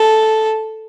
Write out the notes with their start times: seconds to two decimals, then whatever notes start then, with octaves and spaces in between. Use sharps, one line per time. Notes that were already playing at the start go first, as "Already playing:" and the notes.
Already playing: A4